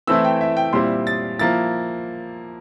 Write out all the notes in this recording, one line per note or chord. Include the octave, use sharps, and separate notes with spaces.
E3 A3 C4 E4 E6
G5
E5
G5
A#2 G3 C4 E4 C6
A6
F3 A#3 E4 A6